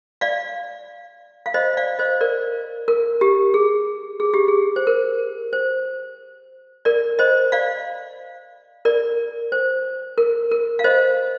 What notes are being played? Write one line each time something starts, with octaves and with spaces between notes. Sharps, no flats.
D5 F5
F5
C5 D#5
D5 F5
C5 D#5
A#4 D5
A#4
G4
G#4
G#4
G4
G#4
C5
A#4
C5
A#4 D5
C5 D#5
D5 F5
A#4 D5
C5
A#4
A#4
F5
C5 D#5